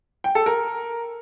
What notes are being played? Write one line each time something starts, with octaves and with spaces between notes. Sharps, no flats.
G5
A4
A#4